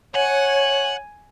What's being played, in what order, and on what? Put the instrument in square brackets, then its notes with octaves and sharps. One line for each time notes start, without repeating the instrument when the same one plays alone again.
[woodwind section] C#5 [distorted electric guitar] F#5 [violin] G#5